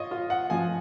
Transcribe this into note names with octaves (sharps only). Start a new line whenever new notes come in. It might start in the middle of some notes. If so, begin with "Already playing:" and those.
Already playing: F4 C#5 D#5
F4
F#5
F3 G#5